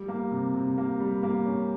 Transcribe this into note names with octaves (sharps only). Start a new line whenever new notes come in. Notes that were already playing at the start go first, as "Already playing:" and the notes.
Already playing: G3
A#3
C3
C3
A#3
G3
A#3
C#4